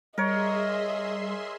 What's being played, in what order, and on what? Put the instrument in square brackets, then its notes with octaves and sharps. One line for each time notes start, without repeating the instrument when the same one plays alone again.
[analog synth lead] G3 [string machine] G#4 E5 C6 [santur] A#4 C#5 [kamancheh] D#5